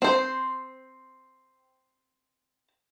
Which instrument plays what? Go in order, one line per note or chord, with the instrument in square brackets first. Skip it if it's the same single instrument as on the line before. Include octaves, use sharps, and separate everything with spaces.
[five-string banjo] C4 C5